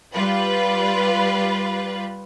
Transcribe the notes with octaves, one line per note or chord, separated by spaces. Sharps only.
G3 F4 B4